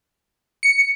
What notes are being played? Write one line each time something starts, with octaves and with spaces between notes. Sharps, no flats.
C#7